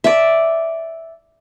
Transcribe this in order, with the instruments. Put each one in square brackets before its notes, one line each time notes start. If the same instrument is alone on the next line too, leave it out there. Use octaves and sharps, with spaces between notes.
[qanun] D5 E5